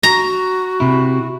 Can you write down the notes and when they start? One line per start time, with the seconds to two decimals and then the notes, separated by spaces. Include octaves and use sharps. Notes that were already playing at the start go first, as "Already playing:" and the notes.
0.03 F#4 A#5
0.80 C3 E4